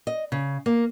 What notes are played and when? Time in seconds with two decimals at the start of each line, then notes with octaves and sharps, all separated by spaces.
0.07 D#5
0.32 C#3
0.66 A#3